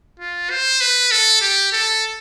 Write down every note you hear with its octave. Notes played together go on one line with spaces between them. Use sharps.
F4
C5
B4
A4
G4
A4